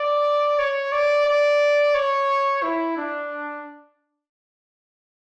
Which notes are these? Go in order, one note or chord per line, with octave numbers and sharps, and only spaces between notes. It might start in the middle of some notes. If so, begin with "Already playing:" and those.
Already playing: D5
C#5
D5
D5
C#5
E4
D4